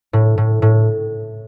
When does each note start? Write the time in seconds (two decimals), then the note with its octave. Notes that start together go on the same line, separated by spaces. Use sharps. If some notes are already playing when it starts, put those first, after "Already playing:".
0.13 A2
0.38 A2
0.62 A2